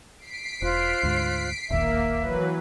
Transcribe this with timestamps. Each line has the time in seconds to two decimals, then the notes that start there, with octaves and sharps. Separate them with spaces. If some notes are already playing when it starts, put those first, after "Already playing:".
0.18 B6 C7 D7
0.62 E1 F4 C5 F#6
1.03 D2 G#2
1.70 E1 A#1 D#2 A#3 E5
2.20 E3 F#3 B4